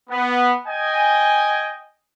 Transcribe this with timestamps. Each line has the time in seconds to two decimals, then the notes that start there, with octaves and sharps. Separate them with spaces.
0.10 B3
0.66 D#5 G5 G#5